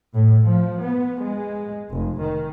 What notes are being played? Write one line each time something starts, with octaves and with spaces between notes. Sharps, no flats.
A2
F3
B3
G#3
F1
D#3